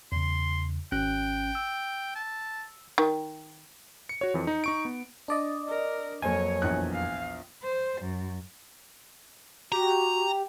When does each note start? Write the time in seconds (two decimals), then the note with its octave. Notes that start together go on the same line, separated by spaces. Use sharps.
0.12 E2 C#3 C6
0.92 G#1 C#4 G5 F#6
1.55 E6
2.15 A5
2.98 D#3
4.09 C#7
4.21 F#4 C#5
4.34 F2 E3
4.47 D#4
4.64 D#4 C#6 D7
4.85 B3
5.28 D4 D5 D#5
5.68 A#4
6.22 F2 F#3 A#3 C#5 G#5
6.62 A#1 E2 F#6
6.93 F5
7.63 C5
8.02 F#2
9.72 F#4 G4 A#5